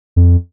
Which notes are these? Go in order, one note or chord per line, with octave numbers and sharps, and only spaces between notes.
F2